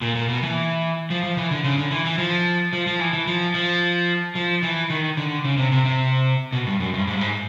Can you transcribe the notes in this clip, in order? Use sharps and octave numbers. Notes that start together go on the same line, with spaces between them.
A#2
A#2
B2
E3
F3
F3
E3
D3
C#3
D3
E3
E3
F3
F3
F3
E3
E3
F3
F3
F3
E3
D#3
D3
C#3
C3
C3
C3
B2
G2
F#2
G2
G#2
G2
G#2